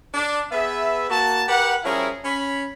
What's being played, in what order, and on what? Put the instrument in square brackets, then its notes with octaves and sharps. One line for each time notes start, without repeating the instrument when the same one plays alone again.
[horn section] D4
B3 G#4 B4 E5
A#3 F#4 A5
G4 A#4 B4 F#5
F3 G3 C#4 E4 G#4 A#4
C#4 B5